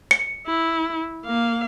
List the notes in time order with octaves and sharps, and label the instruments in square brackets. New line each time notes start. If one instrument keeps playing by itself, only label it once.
[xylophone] C#7
[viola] E4
A#3 F5